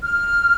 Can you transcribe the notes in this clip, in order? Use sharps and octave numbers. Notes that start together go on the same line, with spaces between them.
F6